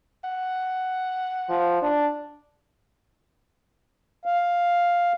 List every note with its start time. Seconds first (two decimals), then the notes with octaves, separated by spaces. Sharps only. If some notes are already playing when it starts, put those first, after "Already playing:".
0.24 F#5
1.50 F3
1.82 D4
4.26 F5